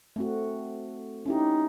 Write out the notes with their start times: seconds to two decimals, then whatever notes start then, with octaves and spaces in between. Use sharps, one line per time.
0.16 A3 C4 F#4
1.26 C#4 D#4 E4 G4